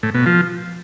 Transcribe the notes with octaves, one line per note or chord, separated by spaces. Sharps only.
A2
B2
F3